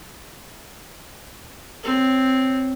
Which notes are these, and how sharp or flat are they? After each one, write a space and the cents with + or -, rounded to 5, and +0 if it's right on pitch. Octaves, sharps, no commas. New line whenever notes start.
C4 +0 C#5 +0